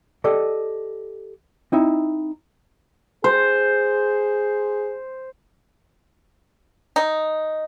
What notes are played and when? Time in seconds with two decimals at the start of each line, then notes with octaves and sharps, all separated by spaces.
0.24 G4 A4 D5 D#5
1.72 C4 D#4 E4 E5
3.24 G#4 C5
6.96 D#4